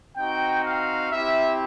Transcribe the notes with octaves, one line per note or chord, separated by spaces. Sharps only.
C4 D#4 F#4 G5
F5
C4 E4 G4 E5